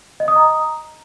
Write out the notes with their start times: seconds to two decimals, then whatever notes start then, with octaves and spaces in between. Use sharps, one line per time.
0.20 D#5
0.28 D#6
0.36 A#5